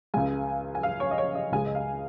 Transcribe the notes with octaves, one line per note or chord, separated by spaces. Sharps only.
C#2 C#3 G#3 G#5
G#5
F5
C#5
D#5
C#5
D#5
C#2 C#3 G#3 G#5
D#5
F5